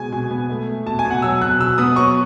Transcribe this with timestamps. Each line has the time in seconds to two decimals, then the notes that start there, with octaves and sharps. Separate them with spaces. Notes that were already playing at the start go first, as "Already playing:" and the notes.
Already playing: B2 G#3 G#5
0.12 B2 G#5
0.31 B3
0.50 A3
0.67 A3
0.86 B2 A5
0.99 G#5
1.05 B2
1.11 F#5
1.22 F#3 E6
1.41 B2 F#6
1.59 B2 E6
1.78 B3 D#6
1.96 F#3 C#6